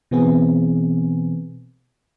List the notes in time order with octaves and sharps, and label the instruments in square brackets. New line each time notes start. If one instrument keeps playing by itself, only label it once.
[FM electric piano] B2 E3 B3 C4 G#4